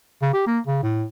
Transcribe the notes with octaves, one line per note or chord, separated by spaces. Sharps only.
C#3
G4
A#3
C#3
A2